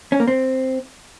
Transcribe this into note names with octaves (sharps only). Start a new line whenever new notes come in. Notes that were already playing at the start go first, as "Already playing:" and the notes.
C#4
A#3
C4